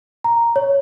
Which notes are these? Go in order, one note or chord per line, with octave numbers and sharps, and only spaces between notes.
A#5
C#5